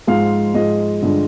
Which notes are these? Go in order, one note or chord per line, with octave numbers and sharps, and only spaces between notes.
G#2 F3 G#3 F5
G#2 F3 G#3 D#5
G2 D3 F3 G#3